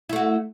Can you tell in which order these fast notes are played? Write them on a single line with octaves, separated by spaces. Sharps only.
E4 A3 F#4